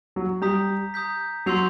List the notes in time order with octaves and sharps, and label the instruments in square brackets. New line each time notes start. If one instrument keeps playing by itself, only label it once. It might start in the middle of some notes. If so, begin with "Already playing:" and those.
[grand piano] F#3
[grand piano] G3 [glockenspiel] A#5 D#6 G6 B6
[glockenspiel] A#5 D#6 G6 B6
[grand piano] F#3 [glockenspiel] C6 E6 G6 C7 F7